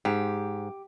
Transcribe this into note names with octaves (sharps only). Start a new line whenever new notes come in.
G#2 G4